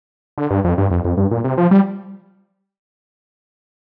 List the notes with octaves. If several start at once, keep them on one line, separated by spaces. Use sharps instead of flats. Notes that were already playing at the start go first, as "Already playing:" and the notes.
D3
G2
F2
G2
F2
F2
G2
A#2
C3
F3
G3